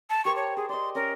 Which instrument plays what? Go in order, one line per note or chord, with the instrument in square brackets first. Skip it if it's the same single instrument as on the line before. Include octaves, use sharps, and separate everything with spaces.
[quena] A5
[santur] G4 A#4 C5 [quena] C#6
[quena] C#5
[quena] G#4 [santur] C5
[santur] D5 D#5 [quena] C6
[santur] C#4 D#5 [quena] A#4